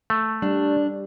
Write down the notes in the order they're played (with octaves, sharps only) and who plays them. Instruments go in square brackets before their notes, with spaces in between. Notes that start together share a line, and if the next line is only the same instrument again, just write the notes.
[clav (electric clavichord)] A3
[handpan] G3 [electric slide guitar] D4